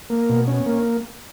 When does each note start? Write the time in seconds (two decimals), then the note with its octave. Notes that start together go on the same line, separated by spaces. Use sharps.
0.10 A#3
0.29 B2
0.47 C#4
0.66 A#3